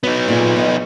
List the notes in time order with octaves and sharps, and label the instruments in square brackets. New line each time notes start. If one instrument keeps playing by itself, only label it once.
[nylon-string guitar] F#3 [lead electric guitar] B3 D#4
[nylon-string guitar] A#2 G#4 G#5
E2 D#5